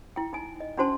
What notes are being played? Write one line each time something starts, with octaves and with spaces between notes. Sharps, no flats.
E4 G5
D#4 G#5
D#5
C#4 D4 F#4 C5 A5 C6